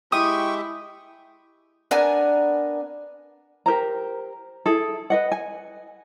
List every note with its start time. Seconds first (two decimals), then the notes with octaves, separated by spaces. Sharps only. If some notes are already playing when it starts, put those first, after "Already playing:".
0.12 G#3 E4 G4 E5 G5 C#6 D#6
1.91 B3 D4 A#4 G#5
3.66 G4 A#4 C5 A#5
4.66 E4 G#4 A4
5.10 B4 D#5 F#5
5.32 G#5